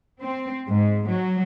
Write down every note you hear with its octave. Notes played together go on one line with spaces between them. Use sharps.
C4
G#2
F#3